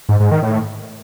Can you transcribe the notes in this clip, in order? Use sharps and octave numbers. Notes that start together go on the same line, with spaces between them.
G#2
G#2
D#3
A2